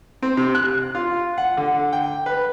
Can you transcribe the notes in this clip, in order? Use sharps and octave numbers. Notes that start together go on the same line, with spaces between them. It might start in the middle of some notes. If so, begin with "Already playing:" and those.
C4
C3
F#6
F4
F#5
D3
G5
B4